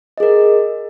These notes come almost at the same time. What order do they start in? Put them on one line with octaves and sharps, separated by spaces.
D#5 G#4 A#4